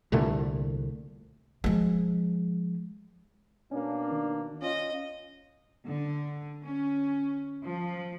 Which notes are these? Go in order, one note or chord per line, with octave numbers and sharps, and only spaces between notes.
C2 A#2 D3 A3
F3 G#3
B2 A#3 C#4 D4
D#3
C#4 F4 D#5
D3
C#4
F3